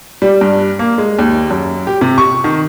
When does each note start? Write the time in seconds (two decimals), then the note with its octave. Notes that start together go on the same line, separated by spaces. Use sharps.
0.22 G3
0.41 G2
0.79 A#3
0.98 G#3
1.19 D#2
1.50 F#2
1.87 G4
2.01 C3
2.18 C#6
2.44 D#3